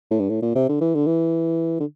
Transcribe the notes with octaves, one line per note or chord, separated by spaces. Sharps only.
A2
G2
A2
A#2
C3
D3
E3
D3
E3
D3